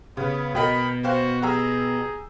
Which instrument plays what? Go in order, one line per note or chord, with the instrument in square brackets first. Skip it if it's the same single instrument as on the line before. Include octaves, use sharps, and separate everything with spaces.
[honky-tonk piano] C#3 [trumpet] B3
[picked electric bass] B2 [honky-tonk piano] A#4 D#5 G5 [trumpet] B5
[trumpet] F#4 [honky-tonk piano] C5 F5 G5
[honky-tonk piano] G4 A#5 E6 [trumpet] G#4